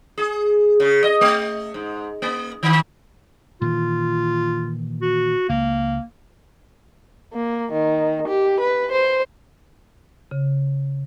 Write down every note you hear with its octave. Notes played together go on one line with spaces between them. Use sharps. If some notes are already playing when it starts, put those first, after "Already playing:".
G#4
C#3
D#5
A3
G#2
A#3
D#3
A#2 D#3 E3 F4
F#4
C#2 A#3
A#3
D#3
G4
B4
C5
C#3